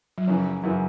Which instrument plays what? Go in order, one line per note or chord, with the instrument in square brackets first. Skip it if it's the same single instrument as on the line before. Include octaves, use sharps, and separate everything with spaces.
[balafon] F#3
[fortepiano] F#2 C#3 E3 [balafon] F3
[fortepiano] F#2 C#3 E3